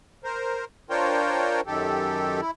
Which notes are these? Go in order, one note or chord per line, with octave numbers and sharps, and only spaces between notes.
A#4 C5
D4 F4 A#4 C5 C#5 G5
F#2 D#3 G4 A4
E4